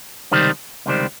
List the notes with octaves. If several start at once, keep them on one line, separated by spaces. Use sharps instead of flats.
C#2 C3 D#3 G3 C4
C#2 C3 D#3 G3 C4